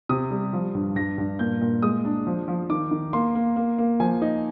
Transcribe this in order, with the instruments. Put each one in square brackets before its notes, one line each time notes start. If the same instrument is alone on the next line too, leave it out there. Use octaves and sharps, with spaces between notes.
[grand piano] C3 D#6
G3
F3
G2
G2 A#6
G2
A#2 G6
A#2
G#3 D#6
D4
F3
F3
D#3 D6
D#3
A#3 C6
A#3
A#3
A#3
F3 G#5
D#4